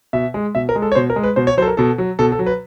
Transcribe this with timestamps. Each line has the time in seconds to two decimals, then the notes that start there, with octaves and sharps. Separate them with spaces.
0.13 B2 E5
0.34 G#3
0.55 B2 E5
0.69 A#4
0.76 G#3
0.82 A4
0.92 C#5
0.95 B2 C5
1.10 A#4
1.16 G#3
1.23 B4
1.36 B2 C5
1.47 C#5
1.57 F#3 C5
1.62 A4
1.68 A#4
1.77 B2 A4
1.98 F#3
2.19 B2 A4
2.32 A4
2.39 F#3
2.46 B4